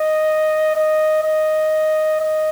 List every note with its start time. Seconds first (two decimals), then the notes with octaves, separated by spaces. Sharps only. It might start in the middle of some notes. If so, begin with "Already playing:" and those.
Already playing: D#5
0.76 D#5
1.23 D#5
2.21 D#5